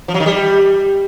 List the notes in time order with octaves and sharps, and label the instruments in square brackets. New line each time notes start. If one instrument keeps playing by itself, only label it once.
[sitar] F3
F#3
D#3
G3